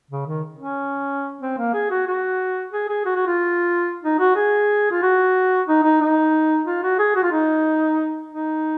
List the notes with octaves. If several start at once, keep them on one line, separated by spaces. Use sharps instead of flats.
C#3
D#3
C#4
C4
A#3
G#4
F#4
F#4
G#4
G#4
F#4
F#4
F4
D#4
F#4
G#4
F4
F#4
D#4
D#4
D#4
F4
F#4
G#4
F#4
F4
D#4
D#4